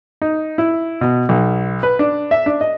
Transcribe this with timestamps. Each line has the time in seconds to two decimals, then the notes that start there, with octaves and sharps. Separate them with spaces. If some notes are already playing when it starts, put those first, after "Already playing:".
0.22 D#4
0.58 E4
1.01 B2
1.29 B1
1.83 B4
1.99 D4
2.31 E5
2.46 D4
2.61 D#5